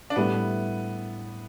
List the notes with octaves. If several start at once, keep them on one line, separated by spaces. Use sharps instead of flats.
D4
A2 G3 B3 E4 A4